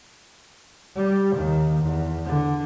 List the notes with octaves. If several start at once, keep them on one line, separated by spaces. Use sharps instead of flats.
G3
D#2 D#3
E2
D3